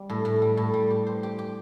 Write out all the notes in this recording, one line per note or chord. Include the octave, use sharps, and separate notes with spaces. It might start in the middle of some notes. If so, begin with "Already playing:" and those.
Already playing: G3
A2
A2
G3
A2
G3
G4
C5
G4
G4